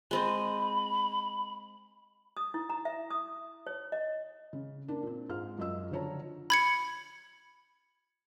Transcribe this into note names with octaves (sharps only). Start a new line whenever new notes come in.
G#3 C4 D#5 B5
D#6
E4
A#5
E5
D#6
C#5
D#5
C#3
A#3 D4
A#2 C4
G#2 G#3 F4 F5 F6
F#2 F4 D#5 E6
F#1 D3 F3 C#5 A5 A#5
B5 G#6 C#7